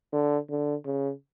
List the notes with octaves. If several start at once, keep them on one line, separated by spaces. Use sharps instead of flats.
D3
D3
C#3